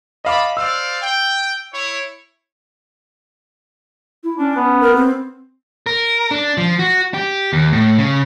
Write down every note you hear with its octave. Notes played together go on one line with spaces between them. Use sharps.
C#5 D#5 F5 A5 B5 D6
C5 D5 F5 E6
G5
E4 C#5
E4
C#4 D4
B3
A#4
C4
A#4
D4
F3
F#4
G4
D#2
A2
C#3